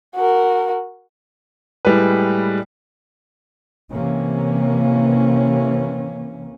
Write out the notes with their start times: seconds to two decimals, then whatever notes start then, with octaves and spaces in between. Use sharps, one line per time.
0.16 F#4 A#4
1.85 A2 G3 G#3 B4
3.93 C3 E3 A#3 C#4